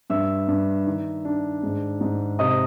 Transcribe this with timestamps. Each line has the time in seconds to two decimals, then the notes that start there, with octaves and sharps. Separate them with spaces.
0.10 G2 E5 E6
0.48 G2
0.87 D#3
1.25 D4
1.63 G#2
2.01 G#2
2.39 C3 D#5 D#6